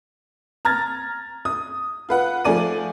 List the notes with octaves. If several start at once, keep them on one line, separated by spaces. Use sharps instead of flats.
A#5 F6 G#6 A6
D#6
F4 B4 F#5
F3 A3 G#4 D5 D#7